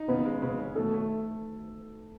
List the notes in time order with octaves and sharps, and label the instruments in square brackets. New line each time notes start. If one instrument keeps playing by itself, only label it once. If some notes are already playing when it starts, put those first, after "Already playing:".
Already playing: [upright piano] D#4
[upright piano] C#3 [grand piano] B3 B4
[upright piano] G#3
[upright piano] C#3 [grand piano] B3 B4
[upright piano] C#4
[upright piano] B2 [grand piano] A3 A4
[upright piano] A3